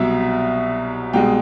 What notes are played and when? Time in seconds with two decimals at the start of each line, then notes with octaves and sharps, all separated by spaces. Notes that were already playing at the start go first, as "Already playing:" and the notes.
Already playing: C2 B2 F#3 E5
1.13 C2 B2 G#3 G5